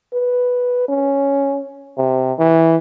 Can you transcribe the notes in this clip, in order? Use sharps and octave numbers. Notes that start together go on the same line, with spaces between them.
B4
C#4
C3
E3